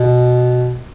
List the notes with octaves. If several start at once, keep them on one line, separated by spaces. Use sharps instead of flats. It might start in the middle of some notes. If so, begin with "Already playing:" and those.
Already playing: B2